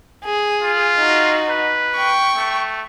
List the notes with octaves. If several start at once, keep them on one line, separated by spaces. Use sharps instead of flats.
G#4
F4
D#4 F#4
B4
G5 C#6
A3